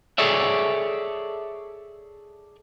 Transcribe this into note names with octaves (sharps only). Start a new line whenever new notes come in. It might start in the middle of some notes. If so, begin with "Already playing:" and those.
G#4 A4 C#5 D5 E5